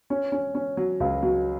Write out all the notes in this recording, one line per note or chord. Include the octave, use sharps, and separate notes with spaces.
C#4
C#4
C#4
F#3
C#2
F#3